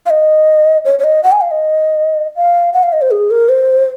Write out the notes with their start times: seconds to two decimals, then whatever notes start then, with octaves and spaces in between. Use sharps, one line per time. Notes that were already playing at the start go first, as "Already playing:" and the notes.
0.06 F5
0.10 D#5
0.85 C#5
0.99 C#5
1.04 D#5
1.24 F#5
1.32 G#5
1.41 F5
1.51 D#5
2.36 F5
2.74 F#5
2.83 F5
2.93 D#5
3.02 C5
3.11 G#4
3.31 A#4
3.49 C5